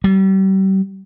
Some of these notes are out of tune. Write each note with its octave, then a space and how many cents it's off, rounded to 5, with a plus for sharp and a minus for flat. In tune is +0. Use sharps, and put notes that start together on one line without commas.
G3 -35